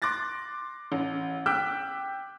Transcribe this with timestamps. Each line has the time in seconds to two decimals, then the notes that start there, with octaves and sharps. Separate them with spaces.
0.02 C6 D6 F#6 A6 A#6
0.92 A1
1.46 G5 D6 E6 F#6 G6 B6